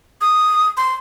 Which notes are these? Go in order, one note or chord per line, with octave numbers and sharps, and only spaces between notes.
D#6
C6